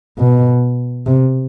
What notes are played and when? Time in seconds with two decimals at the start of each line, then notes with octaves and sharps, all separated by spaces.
0.18 B2
1.06 C3